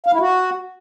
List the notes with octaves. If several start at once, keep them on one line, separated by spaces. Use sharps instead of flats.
F5
E4
F#4